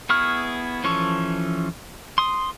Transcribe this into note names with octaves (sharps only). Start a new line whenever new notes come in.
B3 E4 G#4 C#6 F6
E3 F3 C#4 A4 C#6
C6 D#6